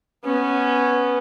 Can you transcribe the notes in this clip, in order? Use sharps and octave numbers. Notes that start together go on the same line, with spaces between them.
B3 C#4